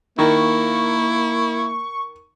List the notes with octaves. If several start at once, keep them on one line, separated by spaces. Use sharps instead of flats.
D#3 A#3 E4 C#6